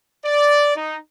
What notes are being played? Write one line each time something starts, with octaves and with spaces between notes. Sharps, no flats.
D5
D#4